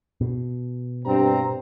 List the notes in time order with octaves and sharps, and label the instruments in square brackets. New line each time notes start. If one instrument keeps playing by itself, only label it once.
[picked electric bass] B2
[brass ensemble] G2 C4 A#5